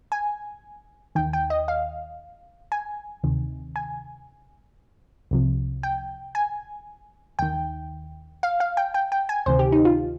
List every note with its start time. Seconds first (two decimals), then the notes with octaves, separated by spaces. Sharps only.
0.12 G#5
1.15 D#2 D#3 G5
1.33 G5
1.50 D#5
1.68 F5
2.72 G#5
3.23 D2 C3 D#3
3.76 G#5
5.31 C2 C3 F3
5.83 G5
6.35 G#5
7.39 D#2 D#3 G5
8.43 F5
8.60 F5
8.77 G5
8.94 G5
9.12 G5
9.29 G#5
9.46 D2 C3 D#3 C5
9.59 G4
9.72 D#4
9.85 F4